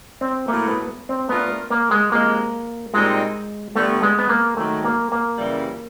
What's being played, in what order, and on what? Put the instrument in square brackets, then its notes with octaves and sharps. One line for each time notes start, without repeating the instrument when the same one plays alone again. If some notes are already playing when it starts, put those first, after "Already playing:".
[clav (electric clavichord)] C4
[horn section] A2 F#3 A3 [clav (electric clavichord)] A#3
[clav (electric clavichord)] B3
C4
[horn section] A3 D4 F4 A#4 [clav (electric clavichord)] B3
[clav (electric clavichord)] A#3
G#3
[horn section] C3 F3 G#3 [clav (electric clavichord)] A#3
[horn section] A#2 G3 C4 D#4 [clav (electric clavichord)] G#3
[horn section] D3 G3 B3 [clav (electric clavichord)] A3
[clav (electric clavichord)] G#3
B3
A#3
[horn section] G#2 D#3 F#3 [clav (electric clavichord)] A3
[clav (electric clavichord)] A#3
A#3
[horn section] F#2 C#3 E3 G3